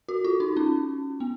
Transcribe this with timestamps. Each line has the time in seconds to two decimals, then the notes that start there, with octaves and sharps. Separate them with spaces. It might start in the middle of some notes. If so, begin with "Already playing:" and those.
0.09 F#4
0.24 F4
0.40 D#4
0.57 C#4
1.20 B3